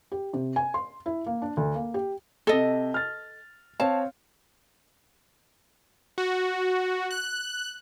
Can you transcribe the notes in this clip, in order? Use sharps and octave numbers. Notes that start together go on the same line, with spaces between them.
G4
C3
G#5
C6
E4
A#3
D4
D2
A#3
G4
C3 A4 D#5 G7
F6 A6
C4 C#5 F5 A5
F#4
F#6